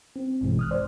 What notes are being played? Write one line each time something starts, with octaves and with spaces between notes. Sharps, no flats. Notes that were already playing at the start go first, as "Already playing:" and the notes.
C4
A1 G2 B2 E3 G#3
D#6 F6 F#6
C5 D5